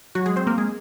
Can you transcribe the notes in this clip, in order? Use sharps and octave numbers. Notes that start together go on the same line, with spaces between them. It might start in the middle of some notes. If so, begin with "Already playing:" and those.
F#3 F#4
G#3 G#4
C4 C5
A#3 A#4
G#3 G#4